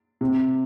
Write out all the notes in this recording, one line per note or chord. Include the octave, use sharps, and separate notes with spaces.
C3